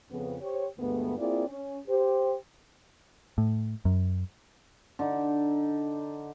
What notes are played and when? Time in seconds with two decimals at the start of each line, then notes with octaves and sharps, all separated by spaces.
0.10 F2 C#3 B3
0.41 G4 C5 C#5
0.78 D2 G2 G#3 A3 B3
1.18 A#3 C4 E4 F4 G#4 D5
1.48 C#4
1.88 G4 C5
3.38 A2
3.85 F#2
4.99 D3 D#4